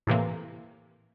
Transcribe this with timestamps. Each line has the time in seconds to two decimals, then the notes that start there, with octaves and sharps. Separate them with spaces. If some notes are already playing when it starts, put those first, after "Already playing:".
0.07 A2 C3 E3 A#3